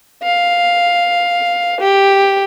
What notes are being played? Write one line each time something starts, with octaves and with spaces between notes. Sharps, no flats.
F5
G4